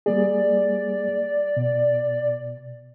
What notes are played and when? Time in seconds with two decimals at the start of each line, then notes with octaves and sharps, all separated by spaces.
0.06 G3 A#3 G#4 D5
1.57 B2